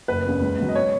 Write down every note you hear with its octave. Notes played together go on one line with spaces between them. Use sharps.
F#1 B4
E2 C#3
C#2
B2 F#3
D#5
C#5